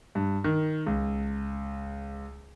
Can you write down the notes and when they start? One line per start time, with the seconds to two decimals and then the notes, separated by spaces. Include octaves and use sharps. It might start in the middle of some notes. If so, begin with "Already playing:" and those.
0.15 G2
0.44 D#3
0.86 C#2